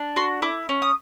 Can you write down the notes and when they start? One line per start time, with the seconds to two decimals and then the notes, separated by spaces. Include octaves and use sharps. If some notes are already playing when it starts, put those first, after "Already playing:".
Already playing: D4
0.16 F#4 C6
0.42 E4 D6
0.69 C#4
0.82 D#6